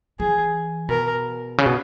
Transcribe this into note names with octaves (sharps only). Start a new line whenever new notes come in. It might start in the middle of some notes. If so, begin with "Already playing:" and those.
E3 G#4
B2 A#4
C#3
B2